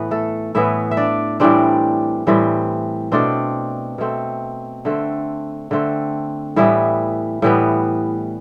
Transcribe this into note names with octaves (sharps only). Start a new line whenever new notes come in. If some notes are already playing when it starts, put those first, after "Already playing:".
Already playing: A2 E3 B3 B4
A3 A4
A2 E3 B3 E4 E5
E5
D4 D5
A2 E3 G3 C4 D4 D5
A2 E3 G3 C4
B2 A3 C4 D4 D5
B2 A3 C4
D3 A3 C4
D3 A3 C4
A2 E3 G3 B3 E4 E5
A2 E3 G3 B3